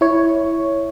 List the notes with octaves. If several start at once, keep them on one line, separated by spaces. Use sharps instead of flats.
E4 C#5